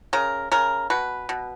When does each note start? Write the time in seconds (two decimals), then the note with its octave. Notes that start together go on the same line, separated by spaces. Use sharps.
0.13 C#3 A#4
0.52 C#3 A#4
0.90 B2 B4
1.29 B2